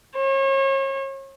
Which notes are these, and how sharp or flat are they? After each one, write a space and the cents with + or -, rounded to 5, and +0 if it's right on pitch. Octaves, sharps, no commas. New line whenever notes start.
C#5 -35